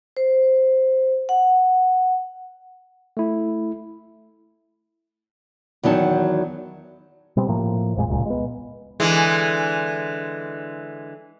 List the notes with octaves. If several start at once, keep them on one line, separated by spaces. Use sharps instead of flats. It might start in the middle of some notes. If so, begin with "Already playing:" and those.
C5
F#5
A3 E4
E2 D#3 F#3 D#4 A5
B2 G3 G#3 C4
A2 F3 A#3
A1 F2 A#2 G#3
D1 C#2 A#2 G#3
G#3 B3
D3 E3 G#3